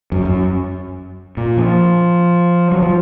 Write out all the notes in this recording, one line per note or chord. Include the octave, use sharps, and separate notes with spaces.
F#2
F#2
A#2
F3
F#3
F3